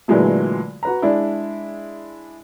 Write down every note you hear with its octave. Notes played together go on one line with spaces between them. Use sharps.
A#2 D3 E3 F#3 G#3 A3
F#4 B4 A#5
G#3 D4 E4